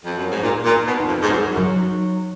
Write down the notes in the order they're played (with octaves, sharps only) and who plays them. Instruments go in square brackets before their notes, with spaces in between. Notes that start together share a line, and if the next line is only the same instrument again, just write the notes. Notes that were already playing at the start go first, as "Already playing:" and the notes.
[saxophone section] F2
F#2
G#2
[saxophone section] A#2 [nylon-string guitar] D#4
[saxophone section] A#2
[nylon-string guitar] D#4
[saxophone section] B2
[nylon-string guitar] D#4
[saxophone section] F2
G#2
[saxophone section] F#2 [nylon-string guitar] D#4
[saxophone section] F#2
[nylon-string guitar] F#3